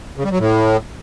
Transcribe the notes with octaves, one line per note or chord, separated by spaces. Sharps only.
C#3
G3
F#3
A2